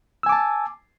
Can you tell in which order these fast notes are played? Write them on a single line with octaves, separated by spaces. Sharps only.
E6 G#5 D6 A5